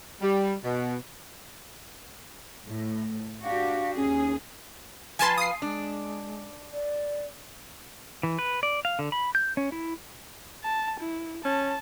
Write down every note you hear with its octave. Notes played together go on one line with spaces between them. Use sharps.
G3
B2
A2
D4 F#4 G4 F5
D#2 C#4 G#4
F3 B4 G#5 A5 C6
F5 D#6 C7
G#3 D4
D5
E3
B4
D5
F5
D3
B5
G6
C#4
E4
A5
E4
C#4 A5